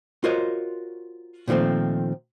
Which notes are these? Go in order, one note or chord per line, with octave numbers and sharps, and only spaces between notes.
F4 F#4 A#4 C5 C#5 D#5
A#2 D#3 F3 A3 C4